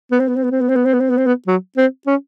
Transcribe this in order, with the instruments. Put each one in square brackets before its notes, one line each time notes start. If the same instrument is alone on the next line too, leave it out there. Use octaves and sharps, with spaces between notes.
[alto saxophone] B3
C4
B3
C4
B3
C4
B3
C4
B3
C4
B3
C4
B3
C4
B3
F#3
C4
C#4